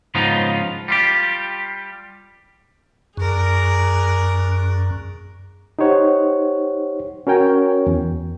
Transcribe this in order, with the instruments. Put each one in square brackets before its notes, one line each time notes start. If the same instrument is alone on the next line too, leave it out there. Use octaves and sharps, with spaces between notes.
[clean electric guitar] G#2 C#3 F3 B3 D#4 F4
G3 F4 G4
[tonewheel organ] F#2 [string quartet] G#4 A#4 D5
[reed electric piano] D#4 G4 C5 C#5 F#5
C#4 F#4 A#4 C#5 G5 G#5
E2